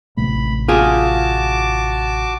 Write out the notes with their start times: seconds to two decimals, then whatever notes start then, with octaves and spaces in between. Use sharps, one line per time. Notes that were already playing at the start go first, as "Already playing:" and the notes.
0.17 A1 C3 A3 B5
0.68 F4 F#4 G#4 A5 D6